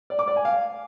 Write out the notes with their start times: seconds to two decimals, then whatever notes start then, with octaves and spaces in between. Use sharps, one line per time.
0.10 D5
0.19 D6
0.28 D5
0.36 G#5
0.45 F5